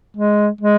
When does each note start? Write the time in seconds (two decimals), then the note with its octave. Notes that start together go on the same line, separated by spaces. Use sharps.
0.17 G#3
0.61 G#3